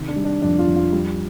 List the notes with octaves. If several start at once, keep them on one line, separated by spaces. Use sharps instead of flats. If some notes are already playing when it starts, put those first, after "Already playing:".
Already playing: C3 D#3
D4
G3
D4
F2 D4
F4
F2
F4
G3